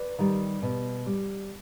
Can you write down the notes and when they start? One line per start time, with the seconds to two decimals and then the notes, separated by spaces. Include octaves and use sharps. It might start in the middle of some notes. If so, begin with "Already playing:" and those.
Already playing: B4 D5
0.19 D#3 G3
0.63 B2
1.06 G3